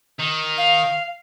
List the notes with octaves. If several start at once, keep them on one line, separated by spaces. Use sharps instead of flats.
D#3
F5